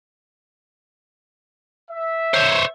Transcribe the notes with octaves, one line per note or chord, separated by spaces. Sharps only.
E5
C5 C#5